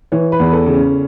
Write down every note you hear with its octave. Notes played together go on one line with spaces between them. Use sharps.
E3 C#5
B4
E2
A4
C#3
C#4